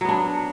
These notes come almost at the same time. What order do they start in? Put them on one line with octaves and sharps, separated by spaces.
F#3 B3 D4